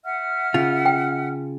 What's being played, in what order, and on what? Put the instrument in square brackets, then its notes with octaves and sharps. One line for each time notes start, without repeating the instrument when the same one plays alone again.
[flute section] E5 F#5 F6
[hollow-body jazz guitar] C#3 F4
[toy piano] G5